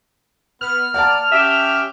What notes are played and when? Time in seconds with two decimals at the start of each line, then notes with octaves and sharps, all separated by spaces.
0.61 B3 F6
0.94 A#3 D5 F#5 A5
1.32 C#4 G4 E5